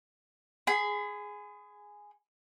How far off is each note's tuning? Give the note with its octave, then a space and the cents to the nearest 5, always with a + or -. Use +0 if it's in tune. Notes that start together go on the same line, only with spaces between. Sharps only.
G#4 +0 B5 +45